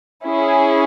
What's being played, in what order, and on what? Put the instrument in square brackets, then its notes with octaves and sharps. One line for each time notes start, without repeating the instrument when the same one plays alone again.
[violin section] C#4 E4 G#4